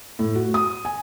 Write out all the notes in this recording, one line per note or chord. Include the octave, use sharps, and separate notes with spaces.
A2
F#4
D#6
G#5